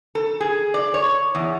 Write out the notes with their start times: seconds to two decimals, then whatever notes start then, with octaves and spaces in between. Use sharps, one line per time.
0.15 A4
0.40 G#4
0.74 D5
0.94 C#5
1.35 E2